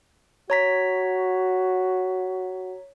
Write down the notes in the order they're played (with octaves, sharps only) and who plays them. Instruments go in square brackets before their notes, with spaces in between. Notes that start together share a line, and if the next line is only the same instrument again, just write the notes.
[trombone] F#4 [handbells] C#5 A#5 B6